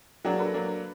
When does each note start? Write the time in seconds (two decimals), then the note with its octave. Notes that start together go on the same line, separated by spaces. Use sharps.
0.24 F#3 A#3 D4 F#4 G#4
0.39 A4 B4
0.54 F#3 A#3 D4